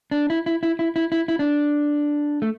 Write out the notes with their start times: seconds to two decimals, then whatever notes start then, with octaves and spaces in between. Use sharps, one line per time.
0.11 D4
0.30 E4
0.46 E4
0.63 E4
0.79 E4
0.96 E4
1.12 E4
1.28 E4
1.39 D4
2.42 A3